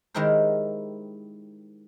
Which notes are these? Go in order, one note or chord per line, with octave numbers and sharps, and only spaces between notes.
D#3 G#3 E4 G4 A#4 C5